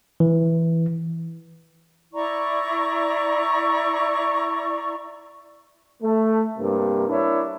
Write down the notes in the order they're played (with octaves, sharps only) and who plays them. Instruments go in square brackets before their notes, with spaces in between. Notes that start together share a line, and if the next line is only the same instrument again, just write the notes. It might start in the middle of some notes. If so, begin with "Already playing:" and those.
[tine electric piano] E3
[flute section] E4 D5 A#5 C#6
[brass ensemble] A3
G2 C3 A#3
D4 E4 A#4 C#5 E5